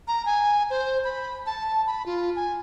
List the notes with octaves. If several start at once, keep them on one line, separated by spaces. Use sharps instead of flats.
A#5
G#5
C5
B5
A5
B5
F4
G#5